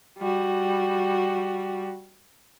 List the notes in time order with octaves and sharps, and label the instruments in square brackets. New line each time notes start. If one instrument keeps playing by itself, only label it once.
[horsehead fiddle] G3 F#4